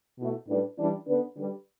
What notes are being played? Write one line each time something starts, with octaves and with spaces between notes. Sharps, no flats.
B2 A3 E4
A2 G3 D4 B4
E3 G3 D4
D3 B3 D4 B4
D3 G3 D4 G4 B4